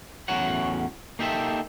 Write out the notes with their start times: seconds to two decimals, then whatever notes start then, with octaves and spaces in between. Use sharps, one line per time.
0.28 E2 A2 C#4 F#4 C#5 F#5
1.19 A#3 D#4 G4 A4 E5